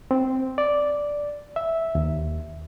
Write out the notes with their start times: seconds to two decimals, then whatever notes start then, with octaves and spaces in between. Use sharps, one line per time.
0.11 C4
0.58 D5
1.56 E5
1.95 D#2